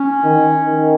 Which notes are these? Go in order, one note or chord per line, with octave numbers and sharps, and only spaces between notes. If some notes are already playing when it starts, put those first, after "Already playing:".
Already playing: C#4
D#3
D#3